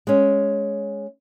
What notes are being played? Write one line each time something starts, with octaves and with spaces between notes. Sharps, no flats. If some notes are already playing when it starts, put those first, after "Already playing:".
G#3 C#4